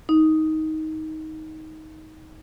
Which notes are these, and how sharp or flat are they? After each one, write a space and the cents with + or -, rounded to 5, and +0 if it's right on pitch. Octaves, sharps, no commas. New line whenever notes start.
D#4 +15